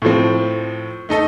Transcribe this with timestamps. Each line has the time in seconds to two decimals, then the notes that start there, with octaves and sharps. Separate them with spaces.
0.02 A2 F3 C4
1.09 A3 D#4 A4 D#5